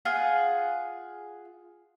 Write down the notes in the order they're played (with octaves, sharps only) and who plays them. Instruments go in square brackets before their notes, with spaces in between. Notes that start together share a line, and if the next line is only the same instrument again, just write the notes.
[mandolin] F4 G#4 F#5